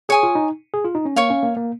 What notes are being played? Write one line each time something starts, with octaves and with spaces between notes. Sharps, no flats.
G#4 C#5 G#5 D#6
F4
D#4
G#4
F4
D#4
C#4
A#3 C#5 F5 C#6
C#4
A#3
A#3